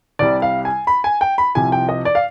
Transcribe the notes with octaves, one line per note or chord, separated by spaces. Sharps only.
C2 C3 G3 D5
F5
G#5
B5
G#5
G5
B5
C2 C3 F3 G#5
G5
D#5
D5
F5